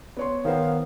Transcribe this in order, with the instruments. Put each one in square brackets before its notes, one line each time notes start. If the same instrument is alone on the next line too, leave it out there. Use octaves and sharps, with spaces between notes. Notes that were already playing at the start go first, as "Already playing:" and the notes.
[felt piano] B3 C#5 C6
[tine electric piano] D#3 B3 [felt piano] A#4 C5 C#5 [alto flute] F5